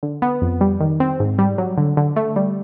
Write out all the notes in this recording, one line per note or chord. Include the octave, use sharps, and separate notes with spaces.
D3
B3
F2
G3
D#3
C4
G#2
G3
F#3
D3
D3
A3
G3